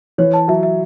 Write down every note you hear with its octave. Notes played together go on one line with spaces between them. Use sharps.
E3 C#5
A5
F#3 E5
E5